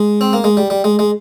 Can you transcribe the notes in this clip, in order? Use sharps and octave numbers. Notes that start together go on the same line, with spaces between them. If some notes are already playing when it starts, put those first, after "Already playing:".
Already playing: G#3
C4
A#3
G#3
G3
G3
G#3
G#3